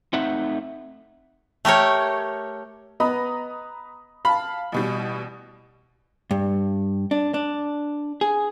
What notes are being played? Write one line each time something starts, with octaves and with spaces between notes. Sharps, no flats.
A3 C4 D#4 E5 F#5
A3 G4 A#4 C#5
B3 D#5 A#5 B5 D#6
F5 A5 B5
A1 B2 G3
G2
D4
D4
G#4